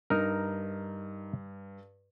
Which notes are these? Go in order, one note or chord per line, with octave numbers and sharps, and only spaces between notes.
G2 D#4 A#4